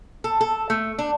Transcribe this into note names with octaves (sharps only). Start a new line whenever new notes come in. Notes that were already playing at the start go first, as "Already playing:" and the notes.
A4
A4
A3
D4